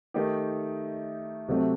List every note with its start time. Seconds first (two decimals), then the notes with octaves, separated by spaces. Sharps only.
0.14 D#3 A3 D#4 G4
1.48 C3 F#3 A3 C4